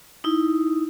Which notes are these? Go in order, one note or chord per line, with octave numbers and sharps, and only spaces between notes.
D#4 E4